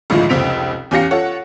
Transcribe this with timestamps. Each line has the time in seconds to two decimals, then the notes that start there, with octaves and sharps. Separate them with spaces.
0.10 G#1 D2 A2 F3 G#3 F4
0.29 F1 C#2 C4 B6 D7 F7
0.91 E2 C#4 G4 F5 A#6 C#7
1.11 F4 A4 C#5 F#5